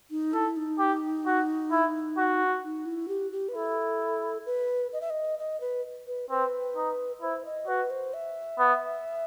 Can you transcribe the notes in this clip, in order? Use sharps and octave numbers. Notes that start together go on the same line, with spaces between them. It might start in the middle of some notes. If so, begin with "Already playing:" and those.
D#4
E4 A4
D#4
G4
F#4
E4
F#4
D#4
E4
G4
G4
B4
E4 A4
B4
D#5
E5
D#5
D#5
B4
B4
C4 B4
D#4
E4 C5
D#5
F#4 B4
C5
E5
B3